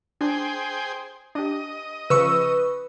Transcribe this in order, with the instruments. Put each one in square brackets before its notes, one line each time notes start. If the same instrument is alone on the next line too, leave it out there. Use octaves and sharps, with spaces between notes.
[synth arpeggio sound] D4 [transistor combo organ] G#4 C5 G5
[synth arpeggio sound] D4 G4 [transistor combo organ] D#5
[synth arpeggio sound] C#3 F3 [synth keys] B4 [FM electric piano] C#6 E6